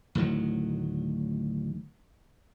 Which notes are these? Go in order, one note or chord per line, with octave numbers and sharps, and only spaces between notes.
D2 A2 D#3 F#3